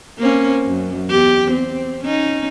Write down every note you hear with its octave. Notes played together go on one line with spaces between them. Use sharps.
A#3 C4 C#4
F#2
E2 G4
C4
C#4 D#4